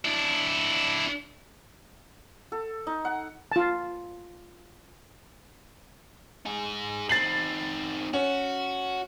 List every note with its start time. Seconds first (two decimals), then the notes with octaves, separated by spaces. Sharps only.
0.05 D4 E4
2.52 A4
2.87 D#4
3.05 F#5
3.52 F4 A5
6.46 D#4 G#4
7.09 C4 D#4 A6 C7 F#7
8.14 C#4 F#4